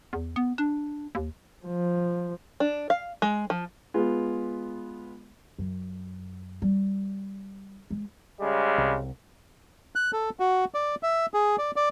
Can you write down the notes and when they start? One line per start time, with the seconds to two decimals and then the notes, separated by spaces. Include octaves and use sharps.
0.13 E2
0.36 B3
0.58 D4
1.15 D#2
1.66 F3
2.60 D4
2.90 F5
3.22 G#3
3.50 F3
3.94 G#3 B3 F4
5.59 F#2
6.62 G3
7.90 G#3
8.39 C#3 G3 G#3
8.78 C2
9.96 F#6
10.13 A4
10.40 F#4
10.74 D5
11.03 E5
11.34 G#4
11.58 D5
11.76 D5